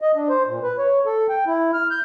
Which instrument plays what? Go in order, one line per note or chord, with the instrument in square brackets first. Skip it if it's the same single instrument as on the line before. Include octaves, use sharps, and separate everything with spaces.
[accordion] D#5
D4
C5
A#2
B4
C#5
A4
G5
E4
F6
G6